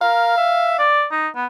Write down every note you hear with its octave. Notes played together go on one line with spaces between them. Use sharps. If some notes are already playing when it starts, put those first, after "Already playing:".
A#4 F5
E5
D5
D#4
B3